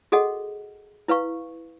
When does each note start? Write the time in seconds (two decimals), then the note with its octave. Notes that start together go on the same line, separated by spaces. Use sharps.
0.12 F#4 G#4 A4 D#5 F#5
1.08 E4 B4 F5 C#6